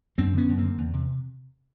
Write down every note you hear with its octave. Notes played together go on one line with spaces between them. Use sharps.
F#2 C4 D4
D3 B3 C#4
F#2
D3 A#3 C4
E2
C3